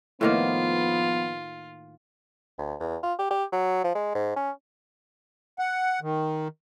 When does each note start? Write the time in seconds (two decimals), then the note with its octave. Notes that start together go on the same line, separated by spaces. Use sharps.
0.21 A2 D#3 F3 A#3 B3 F4
2.58 D2
2.80 E2
3.03 F4
3.19 G4
3.30 G4
3.52 F#3
3.84 F3
3.95 G#3
4.15 G#2
4.36 C#4
5.59 F#5
6.01 D#3